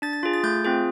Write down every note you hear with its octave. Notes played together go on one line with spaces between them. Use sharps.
D4 A6
A6
F4 G#4
A6
A3 G6
C4 F4 G#4